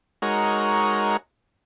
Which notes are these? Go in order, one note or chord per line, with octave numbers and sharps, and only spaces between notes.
G#3 D#4 F#4 A#4 C#5